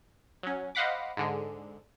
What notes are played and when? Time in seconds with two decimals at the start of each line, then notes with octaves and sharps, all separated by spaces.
0.43 F#3 C#4
0.75 C5 D#5 F5 F#5 B5 D6
1.17 G#2 D3 G#3